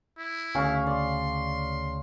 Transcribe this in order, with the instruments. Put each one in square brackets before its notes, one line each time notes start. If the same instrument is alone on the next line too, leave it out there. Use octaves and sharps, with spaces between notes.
[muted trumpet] E4
[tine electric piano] D2 C#3 [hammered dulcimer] C#4 F5 C#6
[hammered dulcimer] D5 [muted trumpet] C6